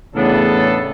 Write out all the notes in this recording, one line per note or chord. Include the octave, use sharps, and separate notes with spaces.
E2 A2 C#3 B3 D4 A4